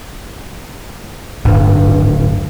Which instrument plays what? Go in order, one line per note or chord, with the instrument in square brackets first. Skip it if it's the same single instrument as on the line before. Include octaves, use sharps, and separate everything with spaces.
[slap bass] D1 G#1 [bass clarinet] G2